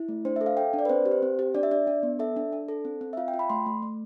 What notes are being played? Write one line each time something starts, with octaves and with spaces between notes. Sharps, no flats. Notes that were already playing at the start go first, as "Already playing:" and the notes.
Already playing: E4
A3
D4 C5
E5
A4
F5
A4 G5
D4
D5
B4
C4 C5
G4
C5
C4
G4
D4 D5
E5
D4 D5
D4
B3
A4 E5
D4
D4
A4
C4
C4
E5
F4 F5
G5
F4
B5
A3 C6
A3
A3